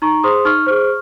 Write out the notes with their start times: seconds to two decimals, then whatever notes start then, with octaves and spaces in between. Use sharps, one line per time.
0.02 D#4 A#5 C#6
0.24 G#4 C5 C6 D#6
0.45 D#4 C#6 F6
0.67 G#4 C5